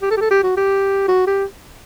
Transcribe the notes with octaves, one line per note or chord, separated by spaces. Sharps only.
G4
A4
G4
A4
G4
F#4
G4
F#4
G4